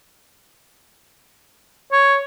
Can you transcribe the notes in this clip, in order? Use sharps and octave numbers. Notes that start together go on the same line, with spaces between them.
C#5